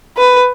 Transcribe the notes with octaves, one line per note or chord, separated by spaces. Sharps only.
B4